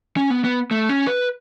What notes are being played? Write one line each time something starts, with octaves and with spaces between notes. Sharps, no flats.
C#4
B3
B3
A3
C#4
B4